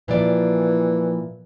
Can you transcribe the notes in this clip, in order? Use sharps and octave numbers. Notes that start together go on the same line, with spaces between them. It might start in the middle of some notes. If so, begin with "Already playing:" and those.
A#2 E3 F3 D5